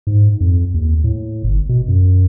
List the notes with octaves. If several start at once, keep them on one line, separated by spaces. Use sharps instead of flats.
G#2
F2
D#2
A2
G1
B2
F#2